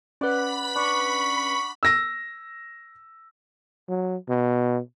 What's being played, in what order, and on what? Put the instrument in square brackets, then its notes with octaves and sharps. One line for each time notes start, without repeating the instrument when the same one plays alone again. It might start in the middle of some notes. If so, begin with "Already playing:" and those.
[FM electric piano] C#4 B4 [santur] D5 F#5 [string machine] B5 B6
[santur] D4 [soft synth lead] C#6
[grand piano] E6 A#6
[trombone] F#3
B2